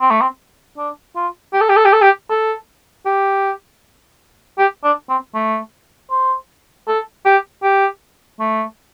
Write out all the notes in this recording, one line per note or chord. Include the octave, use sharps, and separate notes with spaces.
C4
A3
C4
D4
F4
G4
A4
G4
A4
G4
A4
G4
A4
G4
G4
D4
C4
A3
C5
A4
G4
G4
A3